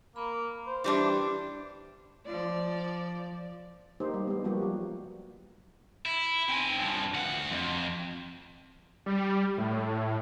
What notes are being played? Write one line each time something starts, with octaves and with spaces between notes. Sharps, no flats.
A#3 B5
C5
E3 G3 D4 G4 C6 D6
F3 D5
A#3 D#4 G4 C5
G3
G#3 B3
F3 G3 A#3 F#4 G4
F#3
E4
C4 G#5
G2 F3
D2 F#5
F2
G3
A2